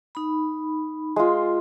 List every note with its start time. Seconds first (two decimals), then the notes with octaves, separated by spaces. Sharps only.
0.15 D#4 B5
1.16 G#3 F4